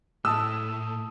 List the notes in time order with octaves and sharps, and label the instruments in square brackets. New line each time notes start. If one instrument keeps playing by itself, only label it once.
[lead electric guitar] A2 [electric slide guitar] A3 E4 [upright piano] A5 D#6 [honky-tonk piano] E6